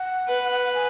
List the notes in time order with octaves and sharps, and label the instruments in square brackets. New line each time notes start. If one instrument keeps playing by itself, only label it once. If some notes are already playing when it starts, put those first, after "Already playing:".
Already playing: [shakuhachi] F#5
[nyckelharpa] B4
[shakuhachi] G#5